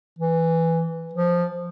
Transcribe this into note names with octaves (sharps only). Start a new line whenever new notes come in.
E3
F3